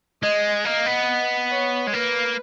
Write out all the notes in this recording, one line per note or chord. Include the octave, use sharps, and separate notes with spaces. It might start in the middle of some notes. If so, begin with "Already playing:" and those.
G#3 D#5
A#3 D#5
B3
C#5
G#3
A#3 B4